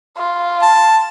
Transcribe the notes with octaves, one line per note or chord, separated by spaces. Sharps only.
F4
A5